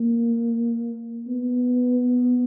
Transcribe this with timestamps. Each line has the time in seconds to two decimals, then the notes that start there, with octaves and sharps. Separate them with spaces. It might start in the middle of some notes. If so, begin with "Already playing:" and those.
Already playing: A#3
1.28 B3